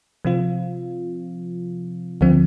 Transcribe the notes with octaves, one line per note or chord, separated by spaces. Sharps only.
C3 F3 C4 F4
D2 D3 F3 C4